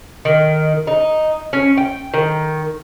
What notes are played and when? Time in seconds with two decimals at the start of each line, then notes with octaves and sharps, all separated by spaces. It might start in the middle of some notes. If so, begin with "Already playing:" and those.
0.25 D#3
0.87 D#4
1.53 C#4
1.77 G5
2.14 D#3